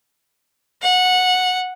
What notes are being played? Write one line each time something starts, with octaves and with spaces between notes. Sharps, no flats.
F#5